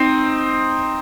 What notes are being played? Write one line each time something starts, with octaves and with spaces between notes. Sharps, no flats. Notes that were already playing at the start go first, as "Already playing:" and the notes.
Already playing: C4 D#4